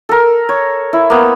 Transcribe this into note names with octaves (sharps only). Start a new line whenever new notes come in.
A4 A#4
C#5
E4
A#3 B3